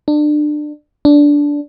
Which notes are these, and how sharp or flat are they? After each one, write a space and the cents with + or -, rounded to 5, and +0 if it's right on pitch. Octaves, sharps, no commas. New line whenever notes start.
D4 +25
D4 -15